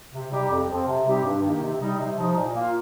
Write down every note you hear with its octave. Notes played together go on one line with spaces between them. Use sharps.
C3
G3 D#4 G4
F2
F3 C4
C3
G3 C4 D#4 G4
G2
D#3 A#3 D#4 G4
C3
G3 D#4
C3
F3 D#4
A#2
A#3 F4